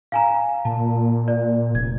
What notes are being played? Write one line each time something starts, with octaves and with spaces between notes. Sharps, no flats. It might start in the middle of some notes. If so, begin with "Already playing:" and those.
F5 G#5 A#5
A#2 A5
D5
F1 G#6